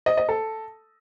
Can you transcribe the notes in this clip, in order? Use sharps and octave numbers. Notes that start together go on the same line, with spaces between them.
D#5
D#5
A4